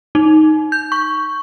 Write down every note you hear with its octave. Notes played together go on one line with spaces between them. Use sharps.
D#4
G6
C#6